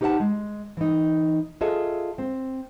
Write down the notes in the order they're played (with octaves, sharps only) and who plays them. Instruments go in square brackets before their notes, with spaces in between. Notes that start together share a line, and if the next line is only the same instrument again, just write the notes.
[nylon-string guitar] D#4 G4 B4 C#5 F#5 A5
G#3
E3 D#4
F4 G#4 A4 D#5 E5
C4